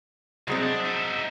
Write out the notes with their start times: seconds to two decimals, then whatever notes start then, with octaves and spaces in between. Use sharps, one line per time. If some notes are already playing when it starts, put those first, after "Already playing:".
0.48 C2 F#3 G#3 C4
0.62 D4
0.81 D#4 E5